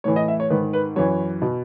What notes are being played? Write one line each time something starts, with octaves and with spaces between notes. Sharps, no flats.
A2 E3 C#5
D#5
E5
C#5
G#2 D#3 B4
B4
F#2 E3 C#5
B2